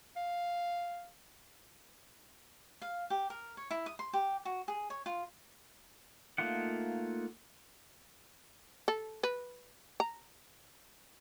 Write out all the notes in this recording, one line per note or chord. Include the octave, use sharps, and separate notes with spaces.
F5
F5
G4
A#4
C#5
E4
D#6
C6
G4
F#4
G#4
C#5
F4
A3 A#3 D#4 F4 F#5
A4
B4
A#5